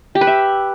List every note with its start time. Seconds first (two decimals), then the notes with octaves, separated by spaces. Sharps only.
0.15 G4
0.21 B4
0.27 E5